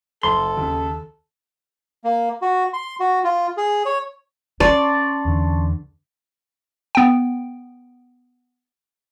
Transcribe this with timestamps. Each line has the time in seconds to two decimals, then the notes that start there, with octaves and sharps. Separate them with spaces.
0.23 F#1 A4 C6
0.57 D#2 C#3
2.04 A#3
2.42 F#4
2.74 C6
3.00 F#4
3.24 F4
3.57 G#4
3.85 C#5
4.60 C#4 D5 A5 C6 C#6
5.25 E2 D3
6.95 B3 G5